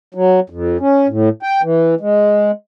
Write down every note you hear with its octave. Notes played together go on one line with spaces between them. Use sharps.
F#3
F2
C#4
A2
G5
E3
G#3